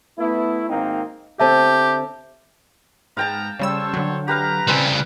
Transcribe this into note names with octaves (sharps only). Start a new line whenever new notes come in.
A3 B3 E4
G#1 A#3 C4 D#4
D3 C4 G4 E5 A5
G#2 B3 F5 G5 A5 A#5
C#3 G3 A4 C5 C#5 E6
D3 F#3
G4 B4 F5 A#5
C#3 G3 C4 B4 G#5